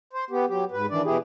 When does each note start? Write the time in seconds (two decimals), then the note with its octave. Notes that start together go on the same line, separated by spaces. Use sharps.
0.13 C5
0.30 B3 G4
0.48 F#3 G4
0.71 G#2 B4
0.90 D#3 E3 D4 D5
1.05 B2 E3 E4 G4 G#4